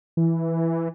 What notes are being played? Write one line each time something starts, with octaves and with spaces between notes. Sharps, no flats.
E3